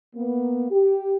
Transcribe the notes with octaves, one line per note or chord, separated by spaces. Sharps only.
A#3 B3
G4